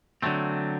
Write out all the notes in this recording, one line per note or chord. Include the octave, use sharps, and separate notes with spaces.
D3 F#3 A3 C4